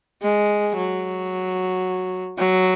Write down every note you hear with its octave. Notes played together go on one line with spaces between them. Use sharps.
G#3
F#3
F#3